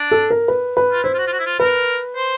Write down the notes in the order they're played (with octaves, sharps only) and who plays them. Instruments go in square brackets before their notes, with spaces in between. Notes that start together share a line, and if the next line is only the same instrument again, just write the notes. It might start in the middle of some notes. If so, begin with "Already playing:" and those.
Already playing: [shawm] D4
[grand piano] A4
A#4
B4
B4
[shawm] F4
[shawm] E4 [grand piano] C5
[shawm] F4
F#4
F4
F#4
E4
F4
[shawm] A#4 [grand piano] B4
[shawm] C5